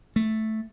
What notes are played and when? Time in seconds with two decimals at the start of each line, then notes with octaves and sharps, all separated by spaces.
0.16 A3